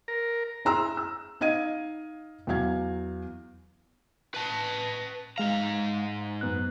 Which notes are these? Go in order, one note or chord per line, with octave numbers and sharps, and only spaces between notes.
A#4
E4 G#4 A#5 C6 E6
E6
D#4 D#5 F5 G#6 D#7
E2 F#3 F5 G#6
B4 A5
G#2 G#3 F5 A#5
F#2 B3 F#6